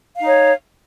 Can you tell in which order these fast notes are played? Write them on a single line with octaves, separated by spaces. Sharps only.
F5 D#4 C#5